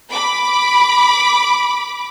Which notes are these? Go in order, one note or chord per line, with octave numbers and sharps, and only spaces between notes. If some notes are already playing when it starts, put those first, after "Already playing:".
B5 D6